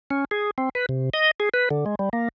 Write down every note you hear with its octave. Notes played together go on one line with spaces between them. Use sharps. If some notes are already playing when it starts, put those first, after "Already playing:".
C#4
G#4
C4
B4
C3
D#5
G#4
B4
D3
G#3
G3
A#3